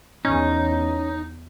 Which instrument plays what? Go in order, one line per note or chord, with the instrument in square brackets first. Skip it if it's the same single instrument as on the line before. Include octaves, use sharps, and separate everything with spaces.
[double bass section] E2 [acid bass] C#4 [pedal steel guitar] D#4